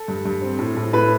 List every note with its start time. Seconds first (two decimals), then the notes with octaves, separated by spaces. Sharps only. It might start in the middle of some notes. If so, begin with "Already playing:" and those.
Already playing: A4
0.08 G2
0.25 G2
0.42 C4
0.59 A2
0.77 A2
0.93 A2 B4